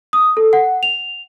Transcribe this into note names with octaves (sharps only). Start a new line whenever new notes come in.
D#6
A4
F#5
F7